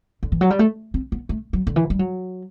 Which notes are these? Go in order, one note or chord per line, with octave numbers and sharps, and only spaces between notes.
D3
E3
F#3
G3
A3
C4
B3
A3
F#3
D3
E3
G3
F#3